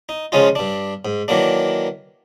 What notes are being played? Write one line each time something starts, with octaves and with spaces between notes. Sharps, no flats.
D#4
C#3 F3 G#3 C#4 D#4 F4
G2 D4
G#2
D#3 E3 F#3 A#3 D4